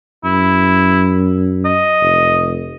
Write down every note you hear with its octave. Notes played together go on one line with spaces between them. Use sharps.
F#2 E4
D#5
F1